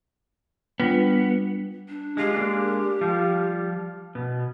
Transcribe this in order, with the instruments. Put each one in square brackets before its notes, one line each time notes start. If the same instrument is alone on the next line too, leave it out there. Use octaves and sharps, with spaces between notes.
[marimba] G3 D4 F4 [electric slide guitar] B3
[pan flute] D4
[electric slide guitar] G#3 F4 [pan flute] G4
[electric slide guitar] G#3 A#3 D4
F3 G3 F4
B2 B3